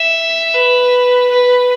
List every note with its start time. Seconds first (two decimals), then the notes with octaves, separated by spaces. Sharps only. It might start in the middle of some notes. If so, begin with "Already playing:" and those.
Already playing: E5
0.54 B4
1.31 B4